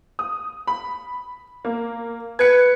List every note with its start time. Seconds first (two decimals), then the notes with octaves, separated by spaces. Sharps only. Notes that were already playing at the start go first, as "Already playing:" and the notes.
0.19 D#6
0.67 B5
1.65 A#3
2.39 B4 G#6 C#7